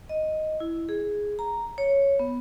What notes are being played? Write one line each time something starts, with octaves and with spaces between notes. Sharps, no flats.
D#5
E4
G#4
A#5
C#5
B3